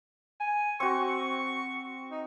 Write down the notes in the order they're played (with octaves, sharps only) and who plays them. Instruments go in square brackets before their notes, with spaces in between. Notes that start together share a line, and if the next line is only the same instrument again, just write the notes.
[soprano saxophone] G#5
[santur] C4 F#4 [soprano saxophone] C#6
[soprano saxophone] D#4